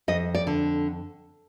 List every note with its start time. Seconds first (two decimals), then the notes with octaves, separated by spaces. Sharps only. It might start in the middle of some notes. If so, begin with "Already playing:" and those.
0.08 F2 D#5
0.35 D5
0.47 D3